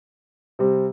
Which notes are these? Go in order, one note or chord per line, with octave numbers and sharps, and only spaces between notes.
C3 G3 C4